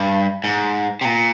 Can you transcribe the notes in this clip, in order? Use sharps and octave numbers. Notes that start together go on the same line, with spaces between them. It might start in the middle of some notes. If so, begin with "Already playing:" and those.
Already playing: G2
G#2
C3
A#2